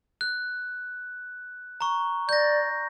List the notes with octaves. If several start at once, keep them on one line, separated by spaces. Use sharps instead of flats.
F#6
A#5 C#6
D5 G6 A#6